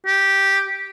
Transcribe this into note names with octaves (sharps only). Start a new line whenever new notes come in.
G4